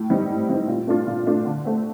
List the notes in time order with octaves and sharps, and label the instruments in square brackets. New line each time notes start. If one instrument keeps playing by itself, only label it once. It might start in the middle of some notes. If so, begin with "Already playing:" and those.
Already playing: [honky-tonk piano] A2
G3 C4 D#4
A2
G3 C4 D#4
A#2
A3 D4 F4
A#2
A3 D4 F4
D3
A3 C4